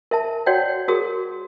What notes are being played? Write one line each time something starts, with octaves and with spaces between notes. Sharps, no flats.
A#4 E5 A5
F#4 C#5 D5 F#5 G5
F#4 G#4 A#4 D#6